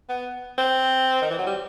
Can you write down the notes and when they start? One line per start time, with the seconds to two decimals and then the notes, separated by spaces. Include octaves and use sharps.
0.09 B3
0.58 C4
1.22 D#3
1.30 E3
1.38 F#3
1.47 G3